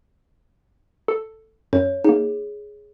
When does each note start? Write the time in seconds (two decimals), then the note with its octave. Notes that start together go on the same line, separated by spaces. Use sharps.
1.08 A4
1.73 F#2 C#5
2.04 A#3 D#4 G#4